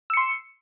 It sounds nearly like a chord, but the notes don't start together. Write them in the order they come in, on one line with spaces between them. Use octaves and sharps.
E6 C#7 C6